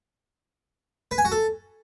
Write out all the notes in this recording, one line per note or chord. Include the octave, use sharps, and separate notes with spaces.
B4
G#5
F#4
A4